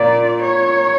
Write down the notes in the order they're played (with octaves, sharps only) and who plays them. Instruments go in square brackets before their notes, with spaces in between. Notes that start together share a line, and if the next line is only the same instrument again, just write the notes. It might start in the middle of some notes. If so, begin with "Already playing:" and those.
Already playing: [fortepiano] A#2 [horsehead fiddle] D5
[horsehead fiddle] C#5